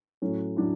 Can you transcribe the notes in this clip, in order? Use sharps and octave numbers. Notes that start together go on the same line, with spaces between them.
A2 F#3 A3 C#4
A2 F#3 D4